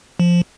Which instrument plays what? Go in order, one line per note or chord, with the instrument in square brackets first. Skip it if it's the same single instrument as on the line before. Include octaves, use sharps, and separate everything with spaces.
[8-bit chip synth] F3